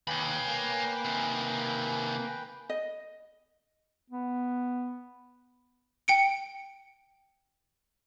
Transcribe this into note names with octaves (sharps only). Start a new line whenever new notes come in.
D#2 B4 C#5 G5 G#5 B5
A#3
C3 D#3
D#5
B3
G5 C#7 D7